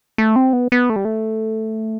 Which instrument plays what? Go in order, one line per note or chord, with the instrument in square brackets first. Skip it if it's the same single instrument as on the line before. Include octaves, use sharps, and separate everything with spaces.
[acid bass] A3
C4
B3
B3
A3
G3
A3